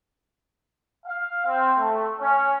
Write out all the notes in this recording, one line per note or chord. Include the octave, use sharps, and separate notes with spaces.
F5
C4
A3
C#4